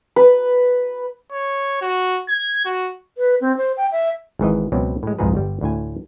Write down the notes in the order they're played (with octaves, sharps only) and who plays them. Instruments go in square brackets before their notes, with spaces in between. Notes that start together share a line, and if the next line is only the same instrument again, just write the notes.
[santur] B4
[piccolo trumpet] C#5
F#4
G#6
F#4
[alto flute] B4
C4
C5
G5
E5
[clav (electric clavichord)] G#1 G#2 E3 D#5
C#2 B2 F#3 C4 D5
A2 G#3
C2 F2 G#2 D#4 G#4 B4
G1 G3
D2 A2 G#5